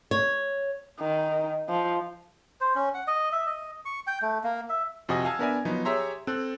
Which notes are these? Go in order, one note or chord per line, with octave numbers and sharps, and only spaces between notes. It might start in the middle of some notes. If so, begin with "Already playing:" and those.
C#5
D#3
F3
C5
C#4
F#5
D#5
E5
D#5
C#6
G5
A3
A#3
E5
F2 C3 F#4 D#5 G#5 D#6
F5 G#5 A5 E6 G#6
B3 D4 A#4 D5 E5 G#5
F3 F#3 B3 D#4
G4 G#4 C#5 E5 A#5 C6
C4 A4 F#6